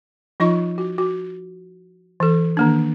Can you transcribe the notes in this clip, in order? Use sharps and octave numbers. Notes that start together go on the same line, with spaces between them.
F3 D#4 F4 D#5 C#6
F#4
F#4
E3 A4
D#3 A#3 D4